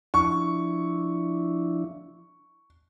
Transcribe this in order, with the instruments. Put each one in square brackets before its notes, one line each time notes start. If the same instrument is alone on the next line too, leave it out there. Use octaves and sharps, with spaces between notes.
[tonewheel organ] F3 D4 E4 [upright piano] C#6